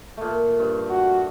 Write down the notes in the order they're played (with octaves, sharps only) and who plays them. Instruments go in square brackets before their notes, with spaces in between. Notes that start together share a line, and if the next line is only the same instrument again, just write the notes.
[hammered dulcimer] A#2 A3
G2
[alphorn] F#4